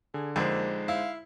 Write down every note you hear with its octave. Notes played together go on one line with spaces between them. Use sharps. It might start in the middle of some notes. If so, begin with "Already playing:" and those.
D3 G#4
F2 D3 G#3 A#3 D#4 C5
E4 F5